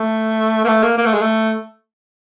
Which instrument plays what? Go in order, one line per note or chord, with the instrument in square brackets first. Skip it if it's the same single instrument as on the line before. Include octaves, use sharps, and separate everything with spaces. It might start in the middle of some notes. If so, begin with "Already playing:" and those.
Already playing: [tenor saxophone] A3
A#3
A3
A#3
A#3
A3
G#3
A3